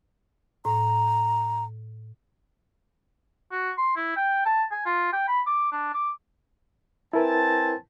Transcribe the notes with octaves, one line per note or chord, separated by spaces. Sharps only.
A2 A#5
F#4
C6
E4
G5
A5
G#5
F4
G5
B5
D6
D4
D6
C4 E4 A#4 B4 G#5 A5